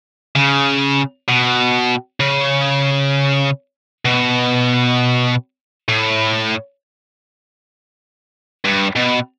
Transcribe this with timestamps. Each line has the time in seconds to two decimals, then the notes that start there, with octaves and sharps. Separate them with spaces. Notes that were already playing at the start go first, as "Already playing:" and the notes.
0.35 C#3
1.28 B2
2.20 C#3
4.05 B2
5.89 A2
8.65 G2
8.96 B2